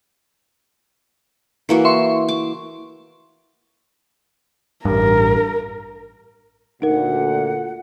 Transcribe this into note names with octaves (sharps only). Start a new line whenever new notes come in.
E3 A#3 F#4
E5 C6 C#6
D6
A1 G2 A#4
D2 A#2 D#4 A#4 F#5